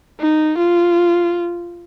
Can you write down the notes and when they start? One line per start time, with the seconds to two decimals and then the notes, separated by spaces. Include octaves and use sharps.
0.20 D#4
0.58 F4